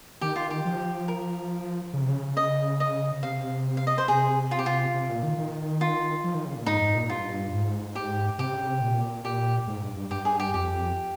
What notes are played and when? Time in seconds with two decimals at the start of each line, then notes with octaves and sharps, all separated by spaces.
0.21 D#3 G4
0.36 F4
0.50 G4
0.65 F3
1.08 A#4
1.93 C#3
2.01 C3
2.09 C#3
2.37 D#5
2.80 D#5
3.22 C3 F5
3.77 F5
3.87 D#5
3.98 C5
4.08 C3 G#4
4.51 F4
4.59 G4
4.66 F4
4.94 C3
5.10 A#2
5.23 D#3
5.38 D#3
5.81 F4
6.24 F3
6.35 D#3
6.45 C#3
6.56 A#2
6.66 G#2 D#4
6.81 G#2
6.95 A#2
7.10 G2 F4
7.52 G#2
7.95 G4
8.38 C3 G4
8.53 C#3
8.68 C3
8.82 A#2
9.25 G4
9.67 G#2
9.82 G2
9.96 G2
10.10 G2 G4
10.25 G#4
10.40 G4
10.54 F2 G4